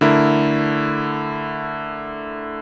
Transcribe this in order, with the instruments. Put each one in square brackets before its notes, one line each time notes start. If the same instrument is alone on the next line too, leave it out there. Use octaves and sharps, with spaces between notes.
[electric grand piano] D3 A3 E4 A#4